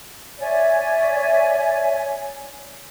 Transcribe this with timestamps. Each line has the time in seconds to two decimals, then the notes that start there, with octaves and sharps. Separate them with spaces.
0.39 C#5 D5 E5 G#5